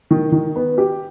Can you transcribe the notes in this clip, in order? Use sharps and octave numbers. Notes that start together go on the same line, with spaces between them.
D#3
D#3
B3
G4